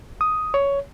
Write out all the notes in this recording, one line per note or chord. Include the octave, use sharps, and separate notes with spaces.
D#6
C#5